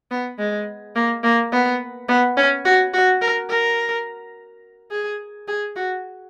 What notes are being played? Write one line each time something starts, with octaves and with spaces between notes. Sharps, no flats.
B3
G#3
A#3
A#3
B3
B3
C#4
F#4
F#4
A#4
A#4
G#4
G#4
F#4